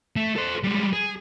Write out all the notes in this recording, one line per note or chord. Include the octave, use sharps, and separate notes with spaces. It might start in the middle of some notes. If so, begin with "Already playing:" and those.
A3
A4 C5
G3 G#3
G#4